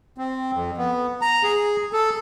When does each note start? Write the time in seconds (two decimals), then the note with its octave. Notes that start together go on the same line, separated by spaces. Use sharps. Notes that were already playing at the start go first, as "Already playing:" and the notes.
0.18 C4
0.53 F2
0.77 B3
1.22 A#5
1.43 G#4
1.93 A4